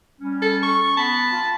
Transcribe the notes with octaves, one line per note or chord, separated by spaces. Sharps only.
G3 C#4
A4
C#6
B3 A5 B5
F4